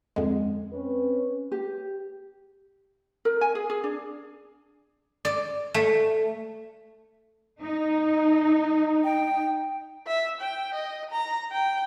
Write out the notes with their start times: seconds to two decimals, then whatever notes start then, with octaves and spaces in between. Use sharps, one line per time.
0.16 F2 D3 G#3
0.73 C4 C#4 B4
1.52 G4
3.25 A#4
3.41 G#5
3.55 G#4
3.70 G#4
3.84 D4
5.25 D5
5.74 A3
7.62 D#4
9.04 G5
10.07 E5
10.41 G5
10.74 D#5
11.11 A#5
11.52 G5